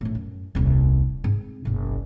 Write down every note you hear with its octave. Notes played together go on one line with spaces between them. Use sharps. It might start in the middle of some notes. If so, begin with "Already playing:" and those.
A#1 A2
F#2
D#1 C2
G#2 C4
F#1 B1